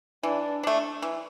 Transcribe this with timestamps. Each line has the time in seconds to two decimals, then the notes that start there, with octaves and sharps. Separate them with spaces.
0.23 E3 D4
0.63 A3 D4
1.02 E3